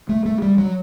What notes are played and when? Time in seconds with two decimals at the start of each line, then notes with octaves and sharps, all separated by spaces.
0.09 A3
0.25 A3
0.42 G3
0.58 F#3